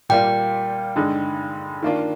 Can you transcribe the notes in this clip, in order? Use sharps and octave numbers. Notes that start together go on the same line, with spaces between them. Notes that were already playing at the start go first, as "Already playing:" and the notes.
A#2 G3 A#3 F4 G5
G2 D3 G#3 D#4
D#3 A#3 D4 F4